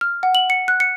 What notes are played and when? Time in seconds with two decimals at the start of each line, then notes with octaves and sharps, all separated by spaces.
0.01 F6
0.23 F#5
0.35 F#7
0.50 C#7
0.68 F#6
0.80 C#7